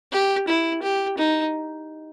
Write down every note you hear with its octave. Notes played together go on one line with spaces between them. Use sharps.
G4
E4
G4
D#4